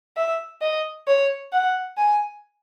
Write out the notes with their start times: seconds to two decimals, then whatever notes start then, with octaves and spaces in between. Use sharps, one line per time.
0.17 E5
0.62 D#5
1.07 C#5
1.53 F#5
1.98 G#5